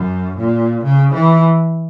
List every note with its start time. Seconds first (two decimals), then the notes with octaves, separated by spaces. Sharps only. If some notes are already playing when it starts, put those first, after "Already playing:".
Already playing: F#2
0.38 A#2
0.84 C#3
1.14 E3